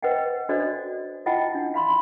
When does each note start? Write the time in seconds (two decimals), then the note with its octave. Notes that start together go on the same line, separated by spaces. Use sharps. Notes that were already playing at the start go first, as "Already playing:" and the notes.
0.02 B4 C5 D#5 F#5 G5
0.49 D4 F#4 A4 C5 D5 D#5
1.26 E4 F4 D#5 F#5 G5 A5
1.55 D4
1.74 F5 B5 C6